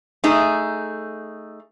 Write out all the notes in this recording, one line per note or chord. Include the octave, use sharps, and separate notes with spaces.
A3 D#4 G#4